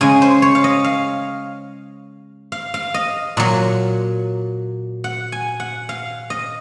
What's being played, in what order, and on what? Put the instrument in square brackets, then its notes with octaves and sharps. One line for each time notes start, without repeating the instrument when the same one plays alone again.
[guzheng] C#3 G#3 G#5
C5
C#5
F5
D#5
F5
F5
F5
D#5
A#2 F#3
F#5
G#5
F#5
F5
D#5